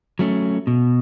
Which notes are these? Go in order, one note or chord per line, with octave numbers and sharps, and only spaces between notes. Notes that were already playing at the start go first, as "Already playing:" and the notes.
F#3 A3 C#4
B2